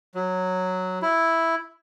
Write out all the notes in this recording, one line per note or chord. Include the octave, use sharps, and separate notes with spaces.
F#3
E4